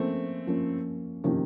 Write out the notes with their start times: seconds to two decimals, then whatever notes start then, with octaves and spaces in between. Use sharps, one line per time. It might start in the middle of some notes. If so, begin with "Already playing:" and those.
Already playing: F3 A3 A#3 C4 C#4
0.47 F3 A#3 C#4
1.24 C3 D#3 F3 A#3 C#4